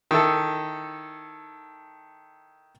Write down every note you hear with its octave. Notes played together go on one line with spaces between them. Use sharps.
D#3 E4 A4